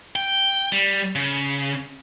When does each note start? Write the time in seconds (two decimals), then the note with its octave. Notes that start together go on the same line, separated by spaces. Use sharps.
0.16 G5
0.72 G3
1.16 C#3